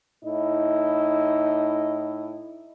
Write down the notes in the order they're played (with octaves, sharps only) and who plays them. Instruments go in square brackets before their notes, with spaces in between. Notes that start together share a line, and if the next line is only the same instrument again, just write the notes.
[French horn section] A2 D#4 E4 D#5